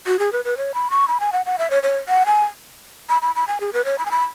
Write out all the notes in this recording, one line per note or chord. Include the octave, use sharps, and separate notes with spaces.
F#4
G#4
B4
B4
C#5
B5
C#6
B5
G#5
F#5
F#5
E5
C#5
C#5
F#5
G#5
B5
B5
B5
G#5
G#4
B4
C#5
B5
G#5
B5